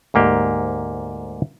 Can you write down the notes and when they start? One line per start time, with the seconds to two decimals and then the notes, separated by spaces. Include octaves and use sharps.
0.14 D2 G#2 A#3 G4